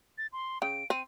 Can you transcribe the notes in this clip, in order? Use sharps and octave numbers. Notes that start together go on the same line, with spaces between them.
A6
C6
C#3 G5 D7
C4 D#7